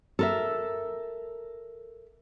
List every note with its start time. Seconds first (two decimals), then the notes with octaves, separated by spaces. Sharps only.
0.19 A4 A#4 E5